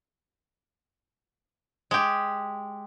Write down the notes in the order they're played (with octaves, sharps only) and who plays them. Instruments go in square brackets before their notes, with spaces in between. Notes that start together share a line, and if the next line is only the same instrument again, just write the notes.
[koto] G#3 G4